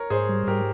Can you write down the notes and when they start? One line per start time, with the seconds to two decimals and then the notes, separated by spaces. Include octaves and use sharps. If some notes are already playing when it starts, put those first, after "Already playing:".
Already playing: A#4 C#5
0.10 G#2 G#4 C5
0.29 G3
0.47 G#2 G4 A#4